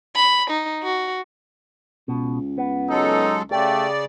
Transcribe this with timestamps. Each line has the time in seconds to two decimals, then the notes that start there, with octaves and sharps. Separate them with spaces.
0.16 B5
0.50 D#4
0.83 F#4
2.08 C#2 B2
2.58 B3
2.90 F#3 G#3 D#4 A4
3.51 C#3 A3 G4 D5